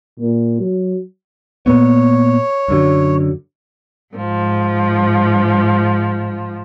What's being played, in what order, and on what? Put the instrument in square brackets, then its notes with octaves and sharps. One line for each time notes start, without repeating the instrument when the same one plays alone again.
[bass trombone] A#2
F#3
[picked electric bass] A#2 B3 [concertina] C#5
[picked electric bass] F#2 D3 F#3
[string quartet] G#2 F3